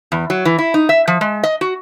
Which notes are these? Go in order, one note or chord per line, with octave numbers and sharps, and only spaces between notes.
E2
F#3
E3
E4
D#4
E5
F3
G#3
D#5
F#4